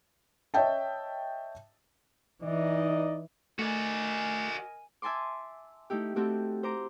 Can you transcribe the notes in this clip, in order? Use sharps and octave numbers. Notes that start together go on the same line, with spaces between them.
C#5 D#5 E5 G5 A5
E3 D#4 D5 D#5
A3 F#4 A#4 D5 D#5 G#5
E5 G#5 A5 C6 D6
A3 D#4 E4 G4
A3 C4 F#4 G4 A4
C5 A#5 D6